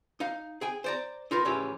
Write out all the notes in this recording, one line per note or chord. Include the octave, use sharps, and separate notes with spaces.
D#4 F5
G#4 G5 G#5
C5 D5 A#5
D#4 F4 A#4 B4
A2 C#3 E3 F3 C#4 G4